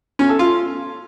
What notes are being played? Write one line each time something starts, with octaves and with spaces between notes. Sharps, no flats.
C#4
A4
F4